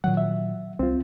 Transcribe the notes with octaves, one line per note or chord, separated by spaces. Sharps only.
A#2 D#3 F#3 F#5
E5
C2 C4 F4